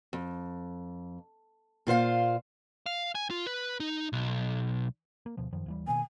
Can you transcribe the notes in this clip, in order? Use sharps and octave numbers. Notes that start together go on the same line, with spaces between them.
F2
A#2 F4 C5 F5
F5
G#5
F4
B4
D#4
B1
A#3
D2 B2 F3
F#2 D#3 F3
D#2 E3 G3
B2 D#3 A#3 G#5